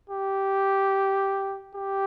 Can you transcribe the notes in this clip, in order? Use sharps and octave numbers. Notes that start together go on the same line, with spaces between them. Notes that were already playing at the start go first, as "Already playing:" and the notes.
G4
G4